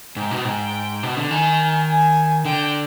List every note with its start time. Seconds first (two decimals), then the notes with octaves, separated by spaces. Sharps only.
0.16 G#2 G5
0.31 B2
0.45 G#2 G5
1.03 B2
1.17 D3
1.31 D#3 G#5
1.88 G#5
2.45 D3 G5